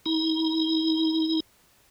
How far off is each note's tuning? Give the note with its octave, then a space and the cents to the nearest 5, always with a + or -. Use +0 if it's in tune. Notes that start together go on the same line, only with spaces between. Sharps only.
D#4 +45